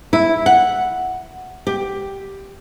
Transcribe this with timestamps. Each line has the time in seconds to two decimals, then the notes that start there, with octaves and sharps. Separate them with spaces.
0.13 E4
0.46 F#5
1.67 G4